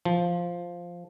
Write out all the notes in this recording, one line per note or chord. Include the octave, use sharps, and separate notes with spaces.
F3